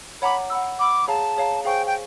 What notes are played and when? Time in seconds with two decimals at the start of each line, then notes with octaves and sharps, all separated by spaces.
0.22 C#5 F#5 A#5 B5 D6
0.50 F#5 B5 E6
0.79 F#5 B5 D6 E6
1.08 G#4 C#5 F5 A5 A#5
1.36 G#4 C#5 F5 A#5
1.65 G#4 C5 F5 G5 G#5 C#6
1.87 G5